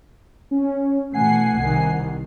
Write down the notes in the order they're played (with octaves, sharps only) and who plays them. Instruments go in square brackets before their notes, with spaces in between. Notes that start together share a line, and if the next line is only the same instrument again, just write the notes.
[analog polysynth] C#4
[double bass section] B2 E3 A3 [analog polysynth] F#5 G#5 C7
[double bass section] C2 C3 D#3